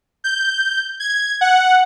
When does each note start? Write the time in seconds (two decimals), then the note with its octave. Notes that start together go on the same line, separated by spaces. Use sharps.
0.24 G6
1.00 G#6
1.41 F#5